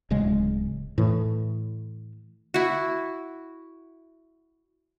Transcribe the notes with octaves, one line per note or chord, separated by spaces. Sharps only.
D1 C#3 G#3
A2 E3
E4 F#4